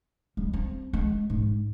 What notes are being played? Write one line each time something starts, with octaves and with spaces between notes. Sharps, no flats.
G3
C4
G#3
G#2